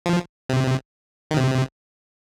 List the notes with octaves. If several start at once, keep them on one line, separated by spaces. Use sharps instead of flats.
F3
C3
D#3
C3